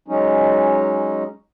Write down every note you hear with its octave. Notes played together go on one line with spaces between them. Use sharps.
F#3 G#3 C#4 D#4